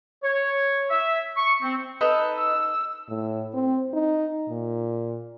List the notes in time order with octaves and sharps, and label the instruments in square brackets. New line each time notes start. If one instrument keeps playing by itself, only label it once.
[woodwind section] C#5
E5
C#6
C4
[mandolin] D#4 A4 B4
[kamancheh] E6
[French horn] A2
C4
D#4
A#2